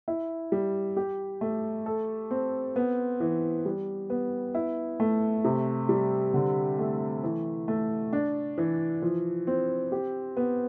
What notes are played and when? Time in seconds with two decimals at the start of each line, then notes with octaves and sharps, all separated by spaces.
0.08 E4
0.52 G3
0.97 G4
1.41 A3
1.86 A4
2.31 C4
2.76 B3
3.20 E3
3.66 G3
4.10 B3
4.55 E4
5.00 A3
5.44 C3
5.89 G3
6.34 D3
6.78 A3
7.23 E3
7.68 A3
8.13 D4
8.58 E3
9.02 F3
9.47 C4
9.92 G4
10.37 B3